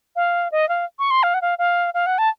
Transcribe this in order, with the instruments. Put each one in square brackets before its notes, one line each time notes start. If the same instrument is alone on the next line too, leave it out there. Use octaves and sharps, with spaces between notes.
[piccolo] F5
D#5
F5
C#6
C6
F5
F#5
F5
F5
F5
F#5
A5